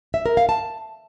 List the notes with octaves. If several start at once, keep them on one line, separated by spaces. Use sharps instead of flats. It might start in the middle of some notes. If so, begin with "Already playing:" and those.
E5
A#4
F5
A5